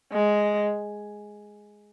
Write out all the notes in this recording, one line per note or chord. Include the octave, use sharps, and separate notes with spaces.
G#3